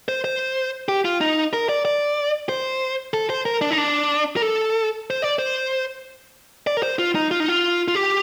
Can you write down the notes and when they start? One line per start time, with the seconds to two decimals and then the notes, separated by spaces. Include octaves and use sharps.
0.08 C5
0.24 C5
0.89 G4
1.05 F4
1.21 D#4
1.53 A#4
1.69 D5
1.85 D5
2.49 C5
3.14 A4
3.30 C5
3.45 A#4
3.61 D4
3.71 D#4
3.78 D4
4.37 A#4
4.42 A4
5.10 C5
5.22 D5
5.39 C5
6.67 D5
6.77 A#4
6.83 C5
6.99 F4
7.15 D#4
7.31 F4
7.40 D#4
7.48 F4
7.88 F4
7.95 G4